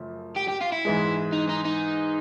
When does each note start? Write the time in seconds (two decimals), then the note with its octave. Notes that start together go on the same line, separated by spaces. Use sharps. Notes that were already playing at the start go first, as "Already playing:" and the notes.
Already playing: F#2 C#3 F3 A3
0.37 G4
0.48 G4
0.61 F4
0.72 E4
0.85 G#2 E3 G#3
1.32 D#4
1.49 D#4
1.65 D#4